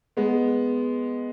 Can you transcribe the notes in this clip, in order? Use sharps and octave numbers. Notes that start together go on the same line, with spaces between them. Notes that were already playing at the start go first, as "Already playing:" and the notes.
G#3 B3